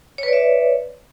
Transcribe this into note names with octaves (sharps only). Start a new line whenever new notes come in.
B4 C#5 D5 E5